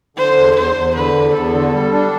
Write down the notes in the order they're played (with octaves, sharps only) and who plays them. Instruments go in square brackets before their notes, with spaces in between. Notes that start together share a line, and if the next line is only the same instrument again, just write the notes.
[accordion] D3 [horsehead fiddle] C5
[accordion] E2
[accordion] E2 [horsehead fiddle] C5
[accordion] E2
[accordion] D3 [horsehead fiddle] B4
[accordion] E2
[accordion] E2 [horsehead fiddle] A4
[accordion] D3
G3
D4